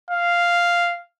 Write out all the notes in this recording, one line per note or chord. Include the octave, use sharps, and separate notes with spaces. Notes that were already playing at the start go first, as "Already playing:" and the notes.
F5